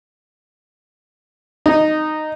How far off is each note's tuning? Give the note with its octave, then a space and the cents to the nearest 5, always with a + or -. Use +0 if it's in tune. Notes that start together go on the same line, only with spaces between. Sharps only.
D#4 -10